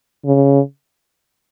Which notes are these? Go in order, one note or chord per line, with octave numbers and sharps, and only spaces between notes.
C#3